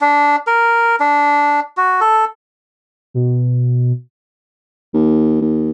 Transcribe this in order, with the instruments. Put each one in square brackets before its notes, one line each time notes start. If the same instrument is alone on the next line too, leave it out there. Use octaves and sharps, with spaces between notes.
[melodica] D4
A#4
D4
F#4
A4
[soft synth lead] B2
[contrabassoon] D#2
D#2